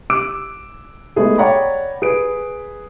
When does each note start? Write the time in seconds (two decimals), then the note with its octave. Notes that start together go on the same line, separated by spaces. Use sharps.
0.10 D6 E6 F#6 D7
1.16 G#3 A3 B3 D#4 G#4 A4
1.38 C#5 D5 F#5 G5 A#5 B5
2.02 G#4 B4 D7